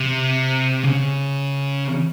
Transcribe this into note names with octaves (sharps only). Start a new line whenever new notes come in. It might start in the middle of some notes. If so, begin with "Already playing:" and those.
Already playing: C3
C#3